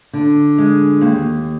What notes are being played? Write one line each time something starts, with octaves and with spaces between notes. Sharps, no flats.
D3
G#3
D#2